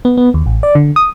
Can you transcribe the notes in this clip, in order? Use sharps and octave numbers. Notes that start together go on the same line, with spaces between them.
B3
B3
D#2
A1
D5
D3
D#6